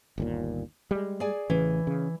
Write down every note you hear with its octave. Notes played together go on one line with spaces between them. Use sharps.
G1 D#2 A#2
G3 G#3
G#4 D5 G#5
A1 C#3 E3
C#3